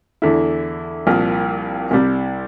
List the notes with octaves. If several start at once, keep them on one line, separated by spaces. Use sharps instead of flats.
E2 D3 A3 E4
C2 A#2 F3 A#3
C2 C3 G3